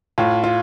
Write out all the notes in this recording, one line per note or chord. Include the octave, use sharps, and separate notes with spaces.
A2 F4
F4